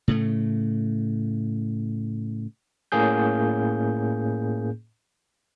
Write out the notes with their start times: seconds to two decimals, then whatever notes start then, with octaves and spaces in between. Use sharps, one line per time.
0.08 A2 C#3 A3
2.92 A2 A#3 C#4 G#4 G6